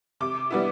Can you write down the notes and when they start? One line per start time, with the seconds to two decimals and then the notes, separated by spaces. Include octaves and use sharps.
0.20 C3 D6
0.51 G3 B3 E4